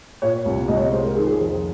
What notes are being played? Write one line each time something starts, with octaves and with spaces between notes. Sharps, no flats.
A#2 C#5
C2
C2 D#5
C#5
D#5
G#3 C5
A#4
D#3 G#4
G#4
F2 G#4
C5